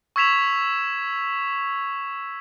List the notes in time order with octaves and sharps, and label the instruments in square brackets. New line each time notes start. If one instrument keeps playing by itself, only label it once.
[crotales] C#6 E6 G#6 B6 E7 F7